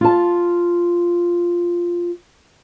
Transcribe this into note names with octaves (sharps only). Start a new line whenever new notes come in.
F4 A5